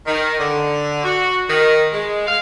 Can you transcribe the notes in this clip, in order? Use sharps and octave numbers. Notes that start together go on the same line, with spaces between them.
D#3
D3
F#4
D#3
G#3
F5